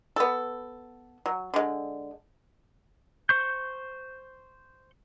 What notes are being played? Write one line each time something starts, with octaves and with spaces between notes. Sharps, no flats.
B3 A4
F#3
D3 G#3
C5 C#6 G6